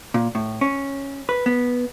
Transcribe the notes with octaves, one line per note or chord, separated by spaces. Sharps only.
A#2
A2
C#4
B4
B3